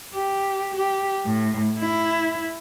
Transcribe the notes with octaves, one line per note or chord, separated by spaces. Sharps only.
G4
G4
A2
E4